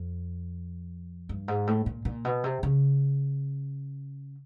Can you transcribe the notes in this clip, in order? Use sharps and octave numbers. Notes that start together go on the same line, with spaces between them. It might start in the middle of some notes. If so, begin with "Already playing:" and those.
Already playing: F2
G2
G#2
A2
A#2
A#2
B2
C3
C#3